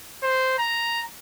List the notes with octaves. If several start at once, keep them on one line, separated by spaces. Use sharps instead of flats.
C5
A#5